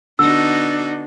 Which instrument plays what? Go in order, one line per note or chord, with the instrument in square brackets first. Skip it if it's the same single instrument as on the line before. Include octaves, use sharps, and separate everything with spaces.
[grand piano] D3 [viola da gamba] B3 D#4 F#4 [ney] D4 [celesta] E6